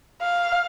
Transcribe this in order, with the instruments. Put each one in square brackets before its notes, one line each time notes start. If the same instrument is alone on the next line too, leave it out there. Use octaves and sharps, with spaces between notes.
[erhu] F5